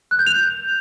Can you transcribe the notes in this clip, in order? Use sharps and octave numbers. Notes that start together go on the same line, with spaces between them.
F#6
G6
F7